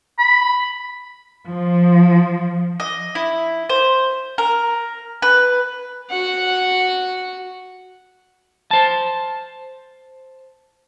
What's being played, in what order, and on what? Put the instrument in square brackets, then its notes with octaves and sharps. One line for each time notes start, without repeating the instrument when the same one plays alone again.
[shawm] B5
[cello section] F3
[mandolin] D#5
E4
C5
A#4
B4
[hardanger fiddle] F#4 F#5
[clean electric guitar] C5 A5